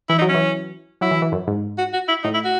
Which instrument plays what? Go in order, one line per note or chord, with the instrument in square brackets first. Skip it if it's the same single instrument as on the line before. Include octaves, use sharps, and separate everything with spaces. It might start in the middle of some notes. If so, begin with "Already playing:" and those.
[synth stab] E3 [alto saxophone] E4
[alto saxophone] D#4
[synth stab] F#3
[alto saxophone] C#4
[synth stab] E3
[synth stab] F#3 [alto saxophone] E4
[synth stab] E3
E3
F#2
G#2
[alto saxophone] F#4
F#4
E4
[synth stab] A2 [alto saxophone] D#4
[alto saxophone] E4
F#4